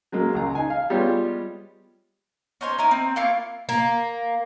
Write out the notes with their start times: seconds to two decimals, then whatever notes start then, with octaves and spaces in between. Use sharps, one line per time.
0.12 F#3 G#3 A#3
0.35 C#2 A#5
0.55 D#4 G#5
0.70 F5
0.90 G3 G#3 B3 F4 G4 C#5
2.61 C#4 D#4 C5 C#5
2.78 D#4 E4 A#4
2.91 C4
3.16 A#3 E4 F4 C#6
3.69 A#3